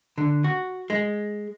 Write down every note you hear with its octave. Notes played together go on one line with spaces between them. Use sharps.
D3
F#4
G#3